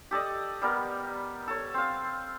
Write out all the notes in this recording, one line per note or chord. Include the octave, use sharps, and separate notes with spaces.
G4 A4 D5 D#5
G3 B3 A#4
A4 C#5
C4 F5